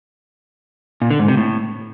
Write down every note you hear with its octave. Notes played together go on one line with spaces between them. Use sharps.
A#2
D3
G#2
C3
A2